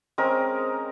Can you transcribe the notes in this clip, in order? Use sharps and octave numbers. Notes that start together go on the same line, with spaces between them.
G#3 C4 C#4 A#4